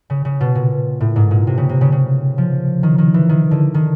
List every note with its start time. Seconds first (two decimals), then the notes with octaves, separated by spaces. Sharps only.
0.10 C#3
0.25 C#3
0.41 B2
0.55 A#2
1.00 A2
1.16 G#2
1.31 A#2
1.47 C3
1.57 C#3
1.69 C3
1.81 C#3
1.92 C#3
2.38 F3
2.83 D#3
2.98 D#3
3.14 E3
3.29 D#3
3.51 D3
3.74 D#3